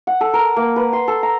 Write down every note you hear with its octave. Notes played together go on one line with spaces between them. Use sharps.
F#5
A4
A#4
A#3
B4
C6
A4
A#5